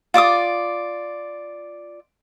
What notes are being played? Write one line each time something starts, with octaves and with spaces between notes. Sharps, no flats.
F4 D5 D6 D#6